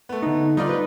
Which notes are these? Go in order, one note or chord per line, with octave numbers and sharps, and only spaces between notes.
A3 B3
D3 D#4
G3 D#4 F4 D5
B4